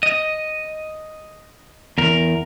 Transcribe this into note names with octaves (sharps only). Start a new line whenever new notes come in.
D#5
E2 A#4